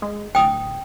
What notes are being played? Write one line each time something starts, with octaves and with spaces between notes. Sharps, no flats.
G#3
D1 G5 D#6